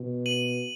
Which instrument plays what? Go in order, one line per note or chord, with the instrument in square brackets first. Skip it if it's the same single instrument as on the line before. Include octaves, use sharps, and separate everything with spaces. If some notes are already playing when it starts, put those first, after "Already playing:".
Already playing: [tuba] B2
[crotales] D#7 F#7